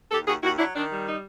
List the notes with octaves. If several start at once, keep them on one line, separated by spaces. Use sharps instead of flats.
D#2 G4 A4
D#2 F#4 G#4
D#2 E4 F#4
F#3 D4 E4
D#3 D4
G3
D#4